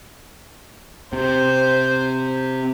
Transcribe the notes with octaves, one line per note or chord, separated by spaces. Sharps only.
C3 C5